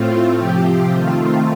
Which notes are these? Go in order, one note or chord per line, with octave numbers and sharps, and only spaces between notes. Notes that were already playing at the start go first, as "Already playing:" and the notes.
Already playing: A2 A3 C4 F4
C3 F3 C4 G4
D#3 A3 C4 F4